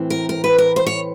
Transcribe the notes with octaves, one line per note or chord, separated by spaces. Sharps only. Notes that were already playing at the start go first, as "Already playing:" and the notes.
Already playing: A2 E3 C4
A#4
A#4
B4
A#4
C5
C#5